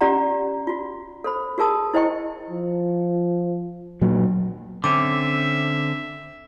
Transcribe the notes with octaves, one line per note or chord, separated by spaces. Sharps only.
C#4 F4 G4 D5 F#5 A#5
F4 F#4
A4 C5 B5
F#4 G#4 A#4 A5 D#6
E4 C5 D#5 G5 C#6
F3
A#2 F#3
D3 C4 C#4 E5 D6